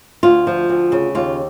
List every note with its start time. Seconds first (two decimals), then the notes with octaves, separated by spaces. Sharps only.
0.23 D2 F4
0.47 F3
0.69 D2
0.92 C#3
1.15 D#2 F4